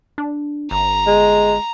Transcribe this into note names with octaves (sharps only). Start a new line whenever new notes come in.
D4
G1 A#5
G#3